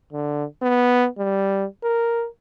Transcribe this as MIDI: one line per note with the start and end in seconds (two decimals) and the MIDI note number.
0.13 0.45 50
0.62 1.08 59
1.18 1.66 55
1.84 2.27 70